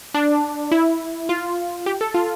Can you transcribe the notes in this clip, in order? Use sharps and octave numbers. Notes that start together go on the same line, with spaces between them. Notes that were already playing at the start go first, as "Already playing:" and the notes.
D4
E4
F4
G4
A4
F4